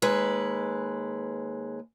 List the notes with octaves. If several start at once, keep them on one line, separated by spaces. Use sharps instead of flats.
D#2 G#3 B4